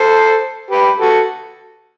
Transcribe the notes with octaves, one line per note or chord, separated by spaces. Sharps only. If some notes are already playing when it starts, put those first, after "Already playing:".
Already playing: A4 C5
G4 B4
F#4 A4